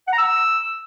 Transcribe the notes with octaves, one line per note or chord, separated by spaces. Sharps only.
F#5
A#5
E6